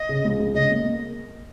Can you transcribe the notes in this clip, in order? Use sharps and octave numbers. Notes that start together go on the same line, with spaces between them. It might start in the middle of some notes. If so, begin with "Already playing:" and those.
Already playing: D#5
C#3
C#2
C#2
C#3 D#5
A#3
A#3